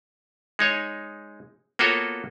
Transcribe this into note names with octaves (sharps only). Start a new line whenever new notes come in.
G#3 D#4 C#5
A#3 B3 F4 F#4 A4 C#5